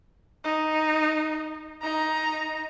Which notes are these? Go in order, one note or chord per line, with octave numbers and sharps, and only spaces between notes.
D#4
D#4 A#5